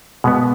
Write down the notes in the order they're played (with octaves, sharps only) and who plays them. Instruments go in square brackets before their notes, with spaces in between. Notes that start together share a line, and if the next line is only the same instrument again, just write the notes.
[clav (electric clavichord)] B2 G#3 B3